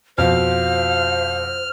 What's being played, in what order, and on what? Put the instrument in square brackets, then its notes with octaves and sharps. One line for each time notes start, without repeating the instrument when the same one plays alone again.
[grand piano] F2 B2 [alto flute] C5 [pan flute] F5 [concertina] F6